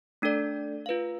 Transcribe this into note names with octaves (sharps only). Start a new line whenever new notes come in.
A3 D4 A4 D5
F4 B4 F5